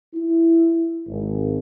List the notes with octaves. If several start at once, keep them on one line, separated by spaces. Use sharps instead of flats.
E4
G#1